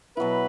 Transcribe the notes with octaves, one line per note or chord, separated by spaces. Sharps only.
B2 F#3 B3 E4 B4